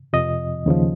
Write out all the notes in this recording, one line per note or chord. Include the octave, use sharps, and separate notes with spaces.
F2 C3 F3 D#5
D#2 C#3 F3